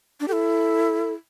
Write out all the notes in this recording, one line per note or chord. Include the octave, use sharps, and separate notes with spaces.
D4
E4 G4 A4